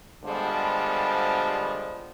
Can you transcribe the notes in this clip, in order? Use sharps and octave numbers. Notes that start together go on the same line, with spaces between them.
D3 F3 G3 G#3 B3